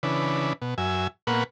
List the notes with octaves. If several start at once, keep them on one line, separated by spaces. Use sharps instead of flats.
C#3 E3 D4 B4
B2
F#2 E5 G#5
A#2 A#3 B3 B4 F#5 C#6